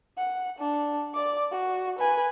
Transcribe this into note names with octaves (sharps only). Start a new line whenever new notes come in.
F#5
D4
D5 D6
F#4
B4 G#5